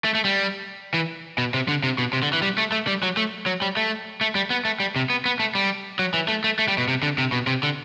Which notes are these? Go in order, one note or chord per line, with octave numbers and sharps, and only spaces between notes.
A3
A3
G3
E3
B2
C3
D3
C3
B2
C3
D3
E3
G3
A3
A3
G3
F#3
A3
F#3
G3
A3
A3
G3
B3
A3
G3
C3
B3
B3
A3
G3
F#3
E3
A3
A3
A3
G3
B2
C3
D3
C3
B2
C3
D3